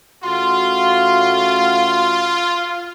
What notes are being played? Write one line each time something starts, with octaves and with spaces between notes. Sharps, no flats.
C#3 A3 F4 F#4 C6